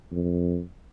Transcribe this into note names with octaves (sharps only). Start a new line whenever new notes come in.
F2